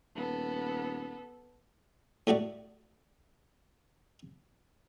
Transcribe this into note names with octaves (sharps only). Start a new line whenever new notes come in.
D#1 B3 A4
A2 A3 F#4 D5